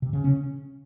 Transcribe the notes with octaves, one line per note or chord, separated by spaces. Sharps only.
C3
C#3
C#4